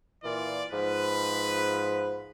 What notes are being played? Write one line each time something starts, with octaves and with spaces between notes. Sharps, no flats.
A#2 E3 F4 D5
G#2 F3 B4 B5